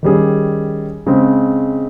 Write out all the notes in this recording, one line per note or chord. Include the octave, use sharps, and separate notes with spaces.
D#3 G3 C#4 G#4
C#3 G#3 C4